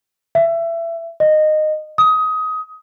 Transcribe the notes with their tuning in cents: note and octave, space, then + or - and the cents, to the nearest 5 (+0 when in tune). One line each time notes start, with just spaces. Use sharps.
E5 +25
D#5 -15
D#6 +20